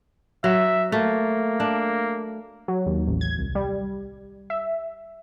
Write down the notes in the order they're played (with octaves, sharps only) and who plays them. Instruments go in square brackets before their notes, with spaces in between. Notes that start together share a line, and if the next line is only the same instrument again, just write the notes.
[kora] F#3 [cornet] E5
[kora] A3 [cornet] A#3
[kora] D4
[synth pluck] F#3
D#2
A1
G#6
C2
G3
E5